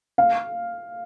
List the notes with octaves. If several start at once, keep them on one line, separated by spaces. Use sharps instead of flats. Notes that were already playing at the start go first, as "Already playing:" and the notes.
F5